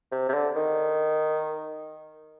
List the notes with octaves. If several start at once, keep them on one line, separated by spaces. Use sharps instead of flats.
C3
C3
D3
D#3